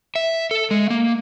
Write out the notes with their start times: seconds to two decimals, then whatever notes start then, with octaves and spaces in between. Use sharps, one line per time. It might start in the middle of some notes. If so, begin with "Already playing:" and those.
0.16 E5
0.51 A4
0.71 G#3
0.90 A#3